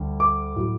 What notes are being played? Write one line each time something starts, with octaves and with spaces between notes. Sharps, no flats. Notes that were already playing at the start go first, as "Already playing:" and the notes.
Already playing: D2 G3
D6
A2 F#3